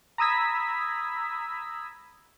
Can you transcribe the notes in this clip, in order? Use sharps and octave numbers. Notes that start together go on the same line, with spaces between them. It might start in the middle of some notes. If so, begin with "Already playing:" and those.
A#5 B5 D#6 E6 G#6 B6